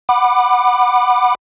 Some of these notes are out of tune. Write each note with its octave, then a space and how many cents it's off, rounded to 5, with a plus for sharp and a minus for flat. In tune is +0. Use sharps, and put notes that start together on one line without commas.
F#5 +0 B5 +0 D6 +30